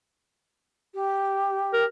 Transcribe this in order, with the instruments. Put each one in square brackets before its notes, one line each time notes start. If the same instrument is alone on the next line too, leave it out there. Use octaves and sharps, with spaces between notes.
[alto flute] G4
[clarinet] A#4